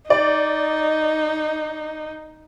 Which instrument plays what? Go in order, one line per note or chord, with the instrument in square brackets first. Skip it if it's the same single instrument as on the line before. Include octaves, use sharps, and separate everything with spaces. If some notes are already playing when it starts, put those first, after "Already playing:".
[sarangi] D#4 [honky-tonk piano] D5